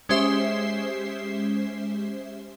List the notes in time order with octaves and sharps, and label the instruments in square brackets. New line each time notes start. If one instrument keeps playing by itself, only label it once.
[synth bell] G#3 C#4 G4 C5 E5 C7